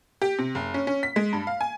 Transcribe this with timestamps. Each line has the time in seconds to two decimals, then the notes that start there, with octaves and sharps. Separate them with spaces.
0.22 G4
0.39 C3
0.55 F#1
0.74 C#4
0.87 C#4
1.03 B6
1.16 G#3
1.33 G2
1.47 F5
1.61 G#5